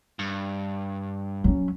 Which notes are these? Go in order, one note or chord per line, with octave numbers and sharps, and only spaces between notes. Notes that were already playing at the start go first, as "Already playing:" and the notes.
G2
F#3 C#4